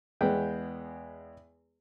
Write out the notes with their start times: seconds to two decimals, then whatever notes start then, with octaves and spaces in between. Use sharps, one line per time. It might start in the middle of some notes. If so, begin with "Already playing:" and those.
0.21 E2 G#3 B3 G5